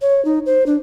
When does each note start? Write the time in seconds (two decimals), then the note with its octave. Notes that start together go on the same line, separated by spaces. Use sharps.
0.02 C#5
0.25 D#4
0.46 C5
0.66 D4